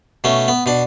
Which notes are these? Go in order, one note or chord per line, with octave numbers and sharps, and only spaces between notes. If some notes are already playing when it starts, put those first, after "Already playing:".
B2 A3 C#4
B3
B2 D4